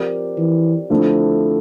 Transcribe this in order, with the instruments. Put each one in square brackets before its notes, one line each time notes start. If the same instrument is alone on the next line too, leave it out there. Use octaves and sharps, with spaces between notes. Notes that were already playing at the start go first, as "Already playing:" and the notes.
Already playing: [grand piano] F3 C4 G4 A#4 D5
[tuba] E3
[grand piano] D3 F3 A3 C4 E4